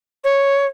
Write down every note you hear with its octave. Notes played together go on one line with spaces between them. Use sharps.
C#5